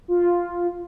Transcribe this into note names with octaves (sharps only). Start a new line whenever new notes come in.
F4